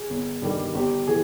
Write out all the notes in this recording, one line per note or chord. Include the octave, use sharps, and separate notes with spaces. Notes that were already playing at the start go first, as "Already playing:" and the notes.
Already playing: G#4
G1
G2 D#3 G3
G1 G4
E3 G#4